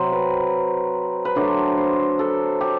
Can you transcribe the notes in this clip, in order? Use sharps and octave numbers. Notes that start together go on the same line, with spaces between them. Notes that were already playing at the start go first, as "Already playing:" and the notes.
Already playing: C3 F#3 C4
B4
B4
D3 F#3 A3 D4 C5
C5
A4
G4